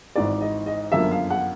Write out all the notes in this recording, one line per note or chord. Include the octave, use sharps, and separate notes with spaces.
G#1 G#2 E3 D5
D#5
D#5
G1 F#2 D3 F3 A#3 E5
F5
F#5